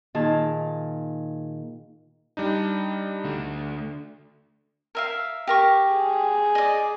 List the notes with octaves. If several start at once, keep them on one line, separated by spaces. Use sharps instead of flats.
A#2 D#3 D#4 F4 G#4 A5
G3 D4 D#4
D3 A3
A#4 E5 F5
G4 A#4 C#6
G#4
D5 D#5